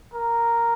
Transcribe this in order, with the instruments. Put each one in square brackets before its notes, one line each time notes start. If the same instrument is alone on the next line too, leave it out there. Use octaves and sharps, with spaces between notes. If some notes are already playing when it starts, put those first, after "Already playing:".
[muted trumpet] A#4